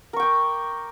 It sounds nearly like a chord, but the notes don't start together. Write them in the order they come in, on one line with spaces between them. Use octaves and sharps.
A#4 C#6 G5 D6